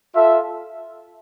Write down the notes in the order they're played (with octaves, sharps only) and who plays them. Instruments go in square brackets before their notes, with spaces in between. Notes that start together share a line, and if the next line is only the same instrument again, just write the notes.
[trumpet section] F4 A4 E5